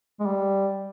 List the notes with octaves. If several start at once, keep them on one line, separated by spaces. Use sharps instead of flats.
G#3
G3